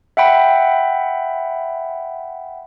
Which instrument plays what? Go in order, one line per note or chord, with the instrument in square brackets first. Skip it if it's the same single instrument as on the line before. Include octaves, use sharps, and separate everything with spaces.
[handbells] E5 F#5 G5 B5